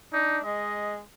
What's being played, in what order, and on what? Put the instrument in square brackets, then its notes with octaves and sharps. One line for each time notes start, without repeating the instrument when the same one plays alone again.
[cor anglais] D4 [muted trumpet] D#4
[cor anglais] G#3 [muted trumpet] D#5